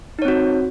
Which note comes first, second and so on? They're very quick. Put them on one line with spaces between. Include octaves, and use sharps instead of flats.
D#4 C#5 C4 F#4